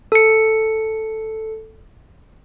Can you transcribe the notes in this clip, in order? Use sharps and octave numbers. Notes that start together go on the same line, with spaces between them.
A4 C#7